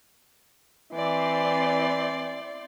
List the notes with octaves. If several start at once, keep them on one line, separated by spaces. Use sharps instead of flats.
E3 C4 D5 C6